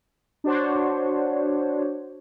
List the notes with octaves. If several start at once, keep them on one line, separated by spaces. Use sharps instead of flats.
D4 F#4 C5 C#5